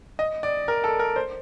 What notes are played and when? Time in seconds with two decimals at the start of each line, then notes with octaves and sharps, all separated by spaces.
0.19 D#5
0.43 D5
0.68 A#4
0.84 A4
0.99 A#4
1.16 C5